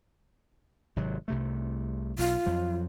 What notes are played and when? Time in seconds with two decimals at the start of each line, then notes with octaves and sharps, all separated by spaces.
0.96 G#1 C3 F#3
1.28 C2 C3 A3
2.19 B1 F4
2.46 F2 F3 F#3